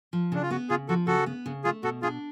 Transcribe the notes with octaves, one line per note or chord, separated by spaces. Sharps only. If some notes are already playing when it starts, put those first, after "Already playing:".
F3
C#3 D4
F4
B3 F#4
C#3 F4 G#4
F3 F#4 A4
C#3 F#4 A4
B3
C#3
A3 F4 G#4
B2 F#4 A4
D4 F4 G#4